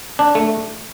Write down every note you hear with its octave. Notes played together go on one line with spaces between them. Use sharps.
D4
A3